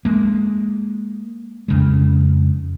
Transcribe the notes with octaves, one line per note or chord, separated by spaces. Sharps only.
G#3 A#3
F2 C#3 G#3